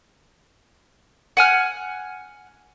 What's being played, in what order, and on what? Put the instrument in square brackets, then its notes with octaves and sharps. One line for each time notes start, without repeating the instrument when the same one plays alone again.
[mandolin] F#5 G#5 F6